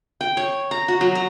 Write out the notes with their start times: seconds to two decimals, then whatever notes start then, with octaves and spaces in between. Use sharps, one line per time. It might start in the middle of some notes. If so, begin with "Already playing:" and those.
0.21 G5
0.37 C#5
0.71 A#5
0.88 F#4
1.01 F#3
1.15 A#5